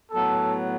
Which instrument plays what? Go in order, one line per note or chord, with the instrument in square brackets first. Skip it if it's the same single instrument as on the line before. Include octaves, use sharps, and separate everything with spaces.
[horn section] A2 F#3 B3 A4